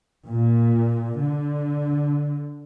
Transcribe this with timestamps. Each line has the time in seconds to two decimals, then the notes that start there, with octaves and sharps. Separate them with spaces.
0.28 A#2
1.22 D3